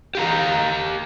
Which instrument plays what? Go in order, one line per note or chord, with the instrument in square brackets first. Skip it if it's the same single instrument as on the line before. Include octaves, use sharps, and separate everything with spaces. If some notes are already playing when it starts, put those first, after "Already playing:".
[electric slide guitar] G4 F5 A#5